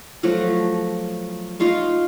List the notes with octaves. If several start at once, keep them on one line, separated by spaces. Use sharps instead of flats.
F3 F#3 A3
D#4 F4 F5 C#6